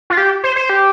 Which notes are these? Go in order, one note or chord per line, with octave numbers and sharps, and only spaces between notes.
F4
G4
C5
C5
G4